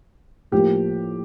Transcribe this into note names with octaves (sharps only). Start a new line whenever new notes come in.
A2 F3 A#3 G4